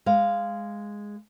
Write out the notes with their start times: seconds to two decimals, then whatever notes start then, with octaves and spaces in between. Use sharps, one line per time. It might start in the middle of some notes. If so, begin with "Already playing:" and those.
0.06 G#3 F5